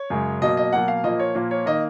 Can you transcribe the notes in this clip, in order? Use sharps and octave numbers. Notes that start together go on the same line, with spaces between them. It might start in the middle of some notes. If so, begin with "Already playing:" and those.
Already playing: C#5
F#2 C#3 G#3
B2 F#3 A#3 D#5
D#5
B2 F#3 A#3 F#5
F5
A#2 F3 A#3 D#5
C#5
A#2 F3 A#3
C#5
D#3 A#3 D#5